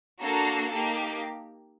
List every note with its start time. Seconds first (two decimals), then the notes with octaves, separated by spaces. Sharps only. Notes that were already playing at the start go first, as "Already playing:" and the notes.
0.21 A#3 D4 F#4 A4 A#5
0.71 A#3 D#4 G4 A5